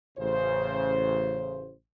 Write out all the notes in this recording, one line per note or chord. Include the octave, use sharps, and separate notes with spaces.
A1 C#3 C5